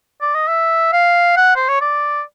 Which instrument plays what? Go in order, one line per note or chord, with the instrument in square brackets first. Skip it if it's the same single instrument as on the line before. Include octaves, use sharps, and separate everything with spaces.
[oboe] D5
D#5
E5
F5
F#5
C5
C#5
D5